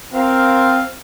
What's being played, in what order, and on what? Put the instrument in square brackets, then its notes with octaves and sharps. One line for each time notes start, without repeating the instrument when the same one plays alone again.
[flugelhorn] C4 [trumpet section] F4 A#4 F5